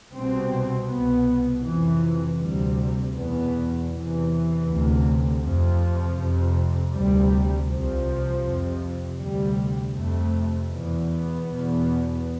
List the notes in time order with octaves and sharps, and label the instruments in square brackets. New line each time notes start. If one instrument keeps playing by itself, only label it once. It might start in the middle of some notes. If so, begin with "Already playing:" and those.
[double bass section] C2 B2 C4
C2 B2 B3
F2 C3 E3
D2 C3 G3
E2 B2 B3
E2 C3 E3
D2 C3
F2 C3 F3
F2 C3
D2 C3 G3
C2 C3 F3
F2 C3
D2 C3 G3
F2 C3 A3
E2 B2 B3
E2 B2